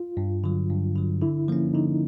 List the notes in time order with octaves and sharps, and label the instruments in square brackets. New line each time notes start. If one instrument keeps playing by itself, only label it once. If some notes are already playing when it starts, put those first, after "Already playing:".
Already playing: [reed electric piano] F4
[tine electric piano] G2
D3 F#3
G2
D3 F#3
[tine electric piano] D3 [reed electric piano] E4
[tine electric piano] F3 A#3 C#4
[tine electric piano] D3 [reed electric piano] D#4